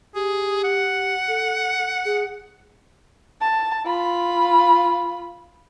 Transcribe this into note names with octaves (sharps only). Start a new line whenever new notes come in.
G4 G#4
F#5
A4
G#4
A5
F4 B5